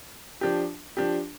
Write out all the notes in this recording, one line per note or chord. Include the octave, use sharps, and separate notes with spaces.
F3 D4 G4
F3 D4 G4